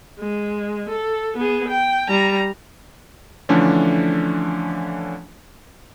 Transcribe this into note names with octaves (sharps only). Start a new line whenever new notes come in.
G#3
A4
B3 G#4
G5
G3 A#5
D3 E3 F3 A3 C#4 D4